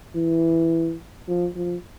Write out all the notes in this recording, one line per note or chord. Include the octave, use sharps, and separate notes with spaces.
E3
F3
F3